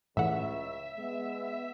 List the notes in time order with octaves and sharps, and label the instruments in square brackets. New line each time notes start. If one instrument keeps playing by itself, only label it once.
[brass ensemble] C#2 C#3 [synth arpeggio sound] A2 E3 F#5 [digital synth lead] E5
[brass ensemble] G#3 B3